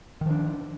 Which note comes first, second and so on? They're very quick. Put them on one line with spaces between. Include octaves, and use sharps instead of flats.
D#3 F3 D4